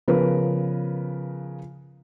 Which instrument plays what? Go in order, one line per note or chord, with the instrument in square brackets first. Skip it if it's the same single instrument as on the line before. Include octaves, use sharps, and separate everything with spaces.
[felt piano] C#3 F3 B3 A#4 B4